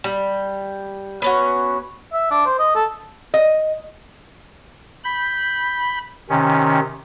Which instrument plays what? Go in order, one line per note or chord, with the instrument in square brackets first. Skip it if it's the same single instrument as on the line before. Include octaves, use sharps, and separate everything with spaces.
[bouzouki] G3
B3 C#4 F#4
[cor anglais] E5
D4
C5
D#5
A4
[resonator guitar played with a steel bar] D#5
[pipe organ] B5 G6
C3 D#3 C#4